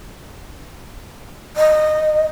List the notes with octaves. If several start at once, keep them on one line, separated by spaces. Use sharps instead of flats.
D#5